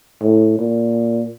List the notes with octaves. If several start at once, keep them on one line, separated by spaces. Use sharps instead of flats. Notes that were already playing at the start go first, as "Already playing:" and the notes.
A2
A#2